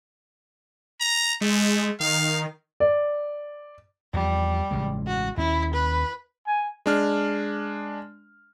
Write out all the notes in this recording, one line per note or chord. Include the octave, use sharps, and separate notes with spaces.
A#5
G#3 A3
D#3 F5
D5
E2 F3 G3
A1 C#3 G#3
F#4
D#2 C#4 E4
B4
G#5
G#3 D4 F6